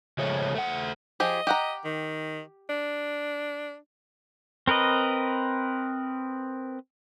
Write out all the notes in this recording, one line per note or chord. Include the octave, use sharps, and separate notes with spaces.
C#3 F3 G#3 A3 C#5
A3 F#5
F3 G4 G#4 D#5
G4 F#5 A#5
D#3
D4
C4 A#4 B4 D#5